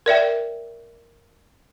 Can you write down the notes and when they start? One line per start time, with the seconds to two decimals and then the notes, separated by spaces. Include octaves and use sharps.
0.06 A#4 D5 E5 G5